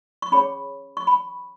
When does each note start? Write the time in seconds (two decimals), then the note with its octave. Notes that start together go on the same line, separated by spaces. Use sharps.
0.22 C#6
0.32 C#4 G#4 C#5 B5
0.97 C#6
1.07 B5